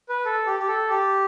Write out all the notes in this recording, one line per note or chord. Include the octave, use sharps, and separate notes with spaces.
B4
A4
G4
G4
A4
G4